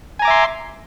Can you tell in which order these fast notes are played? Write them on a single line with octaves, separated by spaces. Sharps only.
G#5 A#5 D6 E5 C6